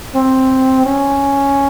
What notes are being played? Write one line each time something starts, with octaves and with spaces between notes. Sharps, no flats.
C4
C#4